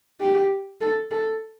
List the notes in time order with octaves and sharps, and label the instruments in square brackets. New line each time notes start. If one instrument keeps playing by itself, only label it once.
[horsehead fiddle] G4
A4
A4